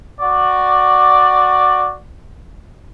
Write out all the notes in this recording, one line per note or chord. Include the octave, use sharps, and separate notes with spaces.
F#4 D5